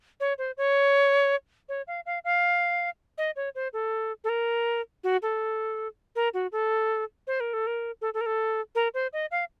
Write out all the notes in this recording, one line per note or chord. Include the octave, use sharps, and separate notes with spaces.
C#5
C5
C#5
C#5
F5
F5
F5
D#5
C#5
C5
A4
A4
A#4
F#4
A4
A#4
F#4
A4
C5
A#4
A4
A#4
A4
A4
A#4
A4
A#4
C5
D#5
F5